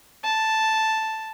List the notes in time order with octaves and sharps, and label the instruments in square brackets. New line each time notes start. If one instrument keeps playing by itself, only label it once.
[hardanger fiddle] A5